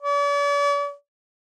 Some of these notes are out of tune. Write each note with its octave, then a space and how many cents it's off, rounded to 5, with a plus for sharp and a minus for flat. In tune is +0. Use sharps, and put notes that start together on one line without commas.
D5 -45